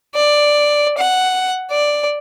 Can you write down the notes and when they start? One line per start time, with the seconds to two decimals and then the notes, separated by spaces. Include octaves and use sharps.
0.15 D5
0.98 F#5
1.71 D5